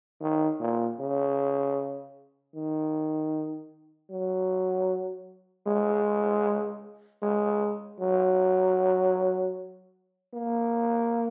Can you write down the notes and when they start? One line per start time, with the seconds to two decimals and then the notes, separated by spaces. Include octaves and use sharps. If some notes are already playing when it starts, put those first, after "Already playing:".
0.21 D#3
0.60 A#2
1.00 C#3
2.55 D#3
4.11 F#3
5.67 G#3
7.22 G#3
8.00 F#3
10.34 A#3